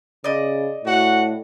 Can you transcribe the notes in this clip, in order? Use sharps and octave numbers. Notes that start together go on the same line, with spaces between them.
C#3 D5 D#5
A2 F#4 F#5